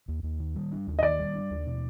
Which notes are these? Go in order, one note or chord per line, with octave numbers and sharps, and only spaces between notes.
D#2
D#2
D#3
G3
D4
D#2
D#5
D#3 D5
G3
D4
D#2
B2